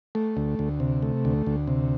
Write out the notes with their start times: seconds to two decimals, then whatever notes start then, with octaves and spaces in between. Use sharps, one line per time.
0.15 A3
0.37 D2
0.59 D2
0.80 C3
1.02 A3
1.25 D2
1.46 D2
1.67 C3